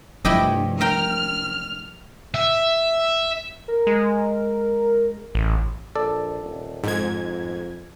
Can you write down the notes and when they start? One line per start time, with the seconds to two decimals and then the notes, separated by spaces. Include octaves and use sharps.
0.25 C2 G2 F3 A3 E4 G4 D#5
0.81 A#4 G5 F6
2.34 E5
3.68 A#4
3.87 G#3
5.35 A1
5.96 A#1 A4 D5
6.42 D#1
6.84 F2 G#2 G#6